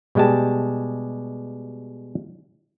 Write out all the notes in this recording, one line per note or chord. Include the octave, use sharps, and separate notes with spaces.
B2 G3 G#3 G4 A5